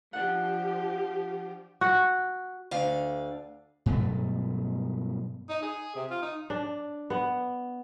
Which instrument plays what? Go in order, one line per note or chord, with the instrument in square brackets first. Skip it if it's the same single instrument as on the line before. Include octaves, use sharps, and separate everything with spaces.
[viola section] F3 G4 [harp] D4 F#5
[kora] F#4
[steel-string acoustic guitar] D2 D3 F5
[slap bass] G2 B2 F#3 A3
[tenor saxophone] D#4
G#4
C3
F4
D#4
[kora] D4
B3